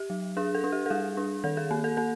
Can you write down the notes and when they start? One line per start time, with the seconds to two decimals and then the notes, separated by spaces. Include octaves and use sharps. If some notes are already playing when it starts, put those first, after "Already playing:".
Already playing: G4
0.10 F#3
0.37 D4 G#4
0.55 A4
0.64 D4
0.72 G4
0.86 A4
0.90 G3 G#4
1.17 D4
1.44 D#3 A4
1.57 G#4
1.71 A#3
1.84 A4
1.97 A#3 A4